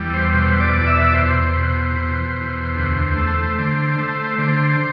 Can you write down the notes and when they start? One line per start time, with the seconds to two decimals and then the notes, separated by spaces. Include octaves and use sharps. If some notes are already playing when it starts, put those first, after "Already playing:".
Already playing: E2 G3
0.14 C5
0.33 B2 C5
0.60 D5
0.74 E2
0.87 E5
1.04 D5
1.14 E2 C5
1.55 B2
1.96 B2
2.37 E2
2.76 D2
3.17 A3
3.58 D3
3.98 A3
4.38 D3 C5